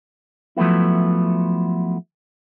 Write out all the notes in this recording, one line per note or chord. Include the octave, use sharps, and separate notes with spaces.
F3 F#3 A3 B3 E4